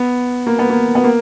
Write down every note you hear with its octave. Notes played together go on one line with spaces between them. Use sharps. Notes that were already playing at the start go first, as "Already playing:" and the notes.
Already playing: B3
A#3
B3
A#3
B3
A#3